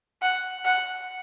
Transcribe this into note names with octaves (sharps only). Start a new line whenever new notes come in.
F#5
F#5